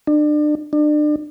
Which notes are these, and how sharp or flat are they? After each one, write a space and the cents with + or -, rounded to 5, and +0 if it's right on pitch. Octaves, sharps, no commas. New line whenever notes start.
D4 +35
D4 +35